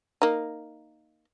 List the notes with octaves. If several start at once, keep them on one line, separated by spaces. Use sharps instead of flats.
A#3 D#4